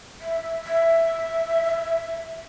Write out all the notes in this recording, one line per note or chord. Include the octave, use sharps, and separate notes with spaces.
E5
E5